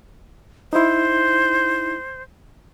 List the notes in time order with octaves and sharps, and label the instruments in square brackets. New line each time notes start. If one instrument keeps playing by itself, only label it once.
[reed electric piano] D#4 E4 [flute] C5